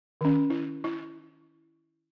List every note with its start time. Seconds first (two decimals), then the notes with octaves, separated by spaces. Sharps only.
0.21 D#3 C#4
0.50 E4
0.84 E4